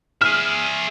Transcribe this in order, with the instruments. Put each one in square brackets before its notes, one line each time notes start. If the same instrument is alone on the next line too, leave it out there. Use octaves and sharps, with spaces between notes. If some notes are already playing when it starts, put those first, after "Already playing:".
[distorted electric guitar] G#4 E5 [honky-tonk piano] F6